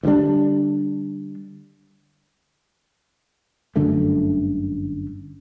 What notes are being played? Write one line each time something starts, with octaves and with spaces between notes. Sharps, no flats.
D2 D3 G3 D4
G1 F#2 D3 A3